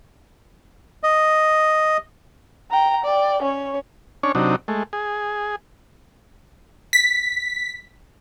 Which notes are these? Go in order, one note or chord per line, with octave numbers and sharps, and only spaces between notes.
D#5
G5 A#5
D5 G5
C#4 C#5
C#4 D4 C#5
C3 F#3 D4 D#4
G#3 A3
G#4
B6